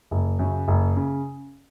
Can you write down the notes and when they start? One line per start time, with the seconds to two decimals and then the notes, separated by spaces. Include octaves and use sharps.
0.11 F#1
0.39 F#2 C#3
0.68 F#1
0.97 C#3